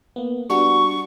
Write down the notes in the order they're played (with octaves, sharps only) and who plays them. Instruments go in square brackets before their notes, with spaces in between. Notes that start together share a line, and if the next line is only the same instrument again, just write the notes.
[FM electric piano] A#3 B3
[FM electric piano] G3 D4 F#4 [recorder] C#6